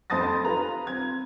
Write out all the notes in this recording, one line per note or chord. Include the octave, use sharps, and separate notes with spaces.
F2 C5 A5 D#6 A6 A#6
F4 B4 A#5
C4 G#6